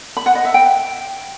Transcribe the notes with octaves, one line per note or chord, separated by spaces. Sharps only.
B5
F#5
D#5
E5
G5